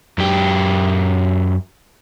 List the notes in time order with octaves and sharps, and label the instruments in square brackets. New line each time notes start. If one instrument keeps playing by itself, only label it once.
[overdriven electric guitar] F#2 G4